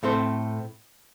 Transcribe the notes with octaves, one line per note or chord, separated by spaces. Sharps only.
A2 A3 C4 A4 C5